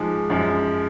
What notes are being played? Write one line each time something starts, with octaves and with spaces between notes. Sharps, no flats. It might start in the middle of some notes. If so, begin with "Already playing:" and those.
Already playing: G#2 F3 G#3
F#2 F3 G#3